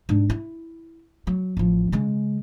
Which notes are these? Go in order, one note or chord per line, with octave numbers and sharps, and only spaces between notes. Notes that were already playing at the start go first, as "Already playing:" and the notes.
G#2 D4
E4
F#3
A1 F3
C#3 G#3